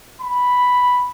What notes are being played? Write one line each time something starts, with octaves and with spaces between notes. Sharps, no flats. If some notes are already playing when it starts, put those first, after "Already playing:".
B5